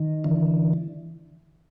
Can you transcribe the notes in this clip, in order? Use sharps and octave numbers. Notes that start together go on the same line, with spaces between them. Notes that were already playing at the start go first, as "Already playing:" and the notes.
Already playing: D#3
D3 E3